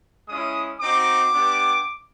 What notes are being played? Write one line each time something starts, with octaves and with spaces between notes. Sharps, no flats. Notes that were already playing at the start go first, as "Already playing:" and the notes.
G#3 C#4 E4 D#6
C4 D#4 F#4 D6
B3 D4 G4